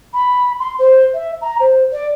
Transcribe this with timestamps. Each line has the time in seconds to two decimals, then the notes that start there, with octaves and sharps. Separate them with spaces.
0.14 B5
0.60 C6
0.79 C5
1.14 E5
1.42 A#5
1.60 C5
1.93 D5